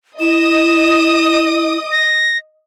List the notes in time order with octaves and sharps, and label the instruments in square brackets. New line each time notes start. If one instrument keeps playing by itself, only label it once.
[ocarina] E4 [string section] D#5 D#6 [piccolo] E7
[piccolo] A#6